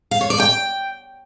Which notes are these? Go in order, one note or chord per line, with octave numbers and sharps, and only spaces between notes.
F5
C#5
D5
G5